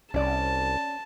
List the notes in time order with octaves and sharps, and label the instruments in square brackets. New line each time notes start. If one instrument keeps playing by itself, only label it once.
[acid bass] C2 [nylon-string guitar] C#4 D5 [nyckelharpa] A5